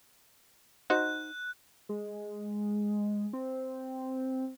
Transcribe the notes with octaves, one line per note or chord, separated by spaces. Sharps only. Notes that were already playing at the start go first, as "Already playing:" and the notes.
D#4 F#4 C5 F#6
G#3
C4